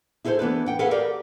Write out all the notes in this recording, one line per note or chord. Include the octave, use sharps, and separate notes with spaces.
E4 G#4 A4 B4 C5
E3 B3 D4 B4
F#5 G5
G#4 A4 B4 F5 F#5
G4 A#4 D5